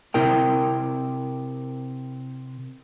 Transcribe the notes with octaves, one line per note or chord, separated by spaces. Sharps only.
C3 E4 A#4 G5